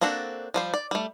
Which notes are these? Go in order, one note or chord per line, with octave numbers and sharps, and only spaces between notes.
A#3 C4 D4 F#4 A4
F3 G3 C5
D5
G3 A3